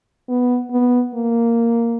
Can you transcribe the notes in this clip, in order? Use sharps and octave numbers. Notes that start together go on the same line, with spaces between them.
B3
B3
A#3